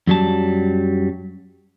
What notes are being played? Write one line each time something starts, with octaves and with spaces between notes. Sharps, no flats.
F#2 F#3 G3 A5